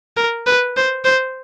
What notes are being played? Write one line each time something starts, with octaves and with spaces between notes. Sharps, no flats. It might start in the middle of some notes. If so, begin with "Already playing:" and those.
A#4
B4
C5
C5